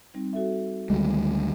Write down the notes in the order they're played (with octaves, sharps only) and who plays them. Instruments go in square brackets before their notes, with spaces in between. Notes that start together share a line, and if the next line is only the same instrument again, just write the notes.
[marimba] G3 C4 D#4
F#4 A4 E5
[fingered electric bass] D2 G3 G#3 [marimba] D#3